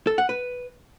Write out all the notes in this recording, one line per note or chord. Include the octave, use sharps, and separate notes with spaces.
A4
F#5
B4